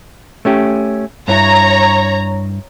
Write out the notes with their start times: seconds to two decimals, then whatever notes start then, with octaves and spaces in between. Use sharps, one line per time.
0.45 A3 C#4 G4
1.28 G2 E4 C#5 A#5